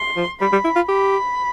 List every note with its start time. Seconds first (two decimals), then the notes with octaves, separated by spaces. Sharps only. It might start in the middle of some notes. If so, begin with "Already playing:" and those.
Already playing: C6
0.17 F3
0.41 G3 B5
0.52 G3
0.64 E4
0.76 F4
0.88 G4 B5